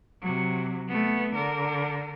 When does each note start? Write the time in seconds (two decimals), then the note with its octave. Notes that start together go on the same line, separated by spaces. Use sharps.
0.21 C3 F#3
0.88 A3 B3
1.34 D3 A#4